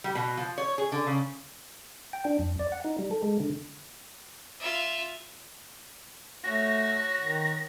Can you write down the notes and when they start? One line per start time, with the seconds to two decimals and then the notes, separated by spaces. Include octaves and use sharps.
0.04 G3
0.15 B2
0.37 F3
0.58 C#5
0.78 G#4
0.92 D3
1.07 C#3
2.13 G5
2.25 D4
2.39 F2
2.59 D5
2.72 F#5
2.84 D#4
2.99 G3
3.11 A4
3.23 G#3
3.40 D3
4.59 F4 E5
6.44 A3 F#4 C#5 A#6
7.21 D#3